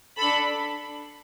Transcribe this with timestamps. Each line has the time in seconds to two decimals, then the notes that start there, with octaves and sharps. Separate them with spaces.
0.18 D4 A4 B5